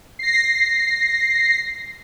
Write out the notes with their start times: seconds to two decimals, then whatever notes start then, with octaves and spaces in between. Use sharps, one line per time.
0.19 A#6 C7